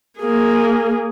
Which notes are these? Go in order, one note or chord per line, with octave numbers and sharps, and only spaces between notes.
A#3 G#4